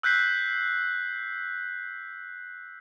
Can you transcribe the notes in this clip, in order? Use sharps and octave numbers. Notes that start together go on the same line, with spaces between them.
E6 F#6 G6 B6 C7